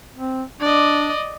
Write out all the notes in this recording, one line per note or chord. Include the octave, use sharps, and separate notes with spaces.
C4
D4 D5 D#5